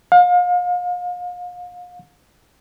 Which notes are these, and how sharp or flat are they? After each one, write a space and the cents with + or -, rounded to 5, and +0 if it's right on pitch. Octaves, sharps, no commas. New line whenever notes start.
F5 +35